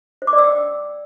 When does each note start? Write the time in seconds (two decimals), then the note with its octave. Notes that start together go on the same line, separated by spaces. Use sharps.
0.22 C5
0.27 D6
0.33 D5
0.38 E6
0.44 G5